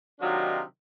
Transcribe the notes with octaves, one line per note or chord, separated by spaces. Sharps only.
C3 D#3 F#3 D4 D#4 F4